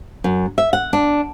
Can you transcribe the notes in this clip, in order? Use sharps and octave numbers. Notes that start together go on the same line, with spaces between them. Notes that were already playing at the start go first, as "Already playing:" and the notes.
F#2
E5
F#5
D4